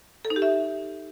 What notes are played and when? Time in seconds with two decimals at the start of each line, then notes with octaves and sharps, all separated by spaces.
0.25 A4
0.30 D#4
0.36 G4
0.42 E5